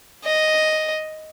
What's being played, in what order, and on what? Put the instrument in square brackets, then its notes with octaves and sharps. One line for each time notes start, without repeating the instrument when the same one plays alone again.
[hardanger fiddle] D#5